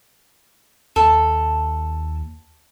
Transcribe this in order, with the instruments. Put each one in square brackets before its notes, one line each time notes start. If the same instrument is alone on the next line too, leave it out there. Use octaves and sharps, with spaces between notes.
[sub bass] D#2 [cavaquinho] A4